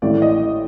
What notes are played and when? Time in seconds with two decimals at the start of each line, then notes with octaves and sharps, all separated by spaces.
0.02 A1 A2 E3 A3 D5
0.22 D#5